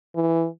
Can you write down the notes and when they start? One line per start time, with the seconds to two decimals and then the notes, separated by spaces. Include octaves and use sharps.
0.15 E3